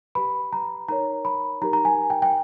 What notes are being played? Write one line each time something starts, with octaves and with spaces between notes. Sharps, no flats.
G4 B4 B5
A#5
D#4 A#4 C#5 A#5
B5
D#4 G4 A#4 A#5
A#5
G#5
G5
G5